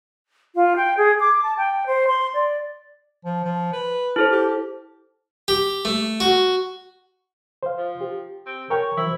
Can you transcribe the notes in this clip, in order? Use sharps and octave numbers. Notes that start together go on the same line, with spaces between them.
F4
G5
G#4
D6
A5
G5
C5
C6
D5
F3
F3
B4
E4 A4 C5
G4
G4
A3
F#4
C5 F5
F3
G4
C4
A#4 C#5 G5
E3 F#3 E4 C5